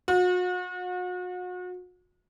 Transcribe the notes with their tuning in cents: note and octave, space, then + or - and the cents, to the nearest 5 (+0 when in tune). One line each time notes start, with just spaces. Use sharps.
F#4 -40